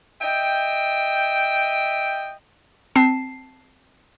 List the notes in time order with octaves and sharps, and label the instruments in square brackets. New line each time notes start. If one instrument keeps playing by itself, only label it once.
[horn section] D#5 E5 G5
[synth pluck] C4 A5 C7